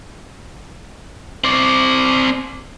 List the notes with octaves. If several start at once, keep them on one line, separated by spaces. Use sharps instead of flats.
C4 D5